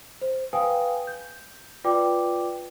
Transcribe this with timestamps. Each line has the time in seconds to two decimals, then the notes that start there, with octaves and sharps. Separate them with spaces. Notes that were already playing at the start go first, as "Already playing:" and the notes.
0.21 C5
0.53 B4 F5 G5 G#5 D#6
1.07 G6
1.84 F4 B4 D5 G5 D6